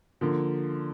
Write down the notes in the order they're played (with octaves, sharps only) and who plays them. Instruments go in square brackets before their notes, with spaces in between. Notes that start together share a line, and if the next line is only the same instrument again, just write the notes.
[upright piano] D3 F3 A#3